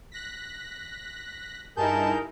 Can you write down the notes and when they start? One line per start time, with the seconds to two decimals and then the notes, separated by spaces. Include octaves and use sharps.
0.12 F#6 A#6 B6
1.77 G2 D#4 E4 G#4 A#4 A5 G6